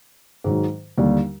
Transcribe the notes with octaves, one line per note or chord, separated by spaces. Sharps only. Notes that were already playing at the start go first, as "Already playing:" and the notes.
G#2 D#3 F#3
D#2 D3 G3